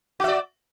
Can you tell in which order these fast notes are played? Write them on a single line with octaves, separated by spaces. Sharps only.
F#4 E5 D5